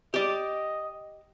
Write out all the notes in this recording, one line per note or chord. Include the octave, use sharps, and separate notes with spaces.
G4 D5 D#5